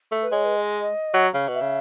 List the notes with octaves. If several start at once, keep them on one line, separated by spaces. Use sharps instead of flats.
A3
B4
G#3 C#5
B4
D#5
F#3
C#3
B2
E5
C#3